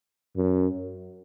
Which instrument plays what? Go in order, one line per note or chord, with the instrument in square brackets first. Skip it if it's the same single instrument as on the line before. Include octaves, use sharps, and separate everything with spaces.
[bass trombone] F#2